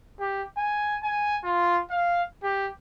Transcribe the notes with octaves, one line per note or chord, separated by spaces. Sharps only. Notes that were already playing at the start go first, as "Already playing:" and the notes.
G4
G#5
G#5
F4
F5
G4